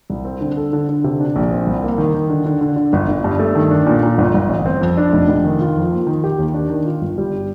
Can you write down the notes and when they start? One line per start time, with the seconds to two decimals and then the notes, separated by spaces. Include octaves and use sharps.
0.10 C2
0.25 C4
0.41 D3
0.57 A4
0.73 D3
0.89 D3
1.04 C3
1.20 D4
1.36 A#1
1.51 C4
1.67 C2
1.83 A#3
1.98 D#3
2.14 D#3
2.30 D3
2.46 D3
2.61 D3
2.76 D3
2.93 G1
3.08 G1
3.24 G2
3.39 A3
3.55 D#3
3.71 D4
3.86 A#2
4.03 A#2
4.18 G1
4.34 G1
4.49 A1
4.66 C4
4.81 F2
4.97 D4
5.13 F1
5.28 F1
5.44 D#3
5.61 F4
5.76 F2
5.91 A#3
6.07 D#3
6.24 G4
6.39 D#2
6.54 D4
6.70 D#3
6.86 F4
7.02 G1
7.18 G3